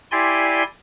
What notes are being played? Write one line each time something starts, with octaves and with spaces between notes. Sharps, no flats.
E4 G4 D5 G#5 C6